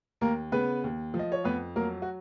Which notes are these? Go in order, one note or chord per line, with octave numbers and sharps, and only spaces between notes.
D#2 A#3 A#4
C#3 B3 B4
D#2
F3
D#5
C#5
F2 B3 B4
F#3 A#3 A#4
F#4